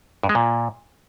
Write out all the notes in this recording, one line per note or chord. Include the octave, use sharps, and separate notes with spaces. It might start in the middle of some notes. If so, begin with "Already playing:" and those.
G2
G#3
A#2